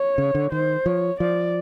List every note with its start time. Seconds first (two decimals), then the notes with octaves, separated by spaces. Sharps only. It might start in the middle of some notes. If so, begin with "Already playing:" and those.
Already playing: C#5
0.18 C#3
0.35 D3
0.52 D#3 C5
0.86 F3 C#5
1.20 F3 D5